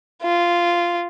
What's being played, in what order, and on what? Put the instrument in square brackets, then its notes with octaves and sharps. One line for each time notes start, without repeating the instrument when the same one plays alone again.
[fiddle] F4